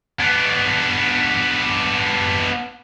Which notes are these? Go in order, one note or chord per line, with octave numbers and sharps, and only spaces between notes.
B3 D4